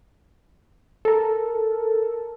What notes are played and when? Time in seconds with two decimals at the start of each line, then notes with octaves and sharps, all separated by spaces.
1.05 A4 A#4